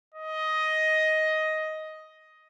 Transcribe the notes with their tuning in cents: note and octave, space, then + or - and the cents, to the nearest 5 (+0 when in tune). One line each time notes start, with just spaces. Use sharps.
D#5 +10